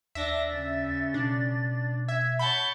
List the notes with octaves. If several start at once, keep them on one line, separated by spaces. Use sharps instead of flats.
D#2 D4 E5 A#6
C#3 A6
B2 D4
E5 G#6
C#5 F#5 A5 B5 G6